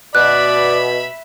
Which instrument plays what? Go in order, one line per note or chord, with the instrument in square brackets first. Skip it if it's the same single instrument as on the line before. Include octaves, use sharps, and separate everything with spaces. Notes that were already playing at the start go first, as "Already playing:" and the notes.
[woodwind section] B2 [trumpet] D5 [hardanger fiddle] E5 B5 [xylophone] F#6